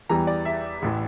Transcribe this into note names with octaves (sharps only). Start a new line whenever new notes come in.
E2 E3 G3 A#5
D5
E5
A1 A2 E3